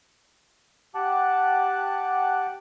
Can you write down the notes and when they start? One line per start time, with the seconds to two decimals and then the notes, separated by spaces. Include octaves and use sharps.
0.95 G4 F#5 A5 D6 F#6